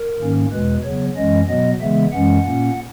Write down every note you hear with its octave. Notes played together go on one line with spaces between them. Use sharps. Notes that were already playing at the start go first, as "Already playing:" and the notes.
Already playing: A#4
G#2 D#3 A#3 C#4
E2 B2 G#3 B4
C#3 F#3 B3 C#5
F#2 E3 G#3 C#4 D#5
B2 F#3 B3 D#5
C#3 E3 G#3 B3 E5
F#2 E3 G#3 C#4 F#5
A#2 A#3 C#4